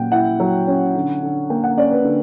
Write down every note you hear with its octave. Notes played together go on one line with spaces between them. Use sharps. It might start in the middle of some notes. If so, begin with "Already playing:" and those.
Already playing: A#2 F#3 C#4 F#5 G5
E4 F#5
F#3
C#4
D3
D3
A#3 G5
F#5
C#4 D5
B4
D3